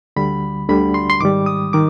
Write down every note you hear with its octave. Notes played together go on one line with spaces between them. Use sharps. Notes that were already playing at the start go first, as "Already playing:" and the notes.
D2 D3 G3 B5
D2 D3 G3 B5
C6
C6
G#2 D#3 G3 D6
D#6
D#3 D6